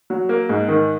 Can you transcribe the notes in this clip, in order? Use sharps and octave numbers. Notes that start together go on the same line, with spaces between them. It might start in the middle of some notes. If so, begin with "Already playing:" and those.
F#3
A#3
G#2
D#3